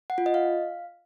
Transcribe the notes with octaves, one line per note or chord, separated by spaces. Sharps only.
F#5
F4
D#5
F5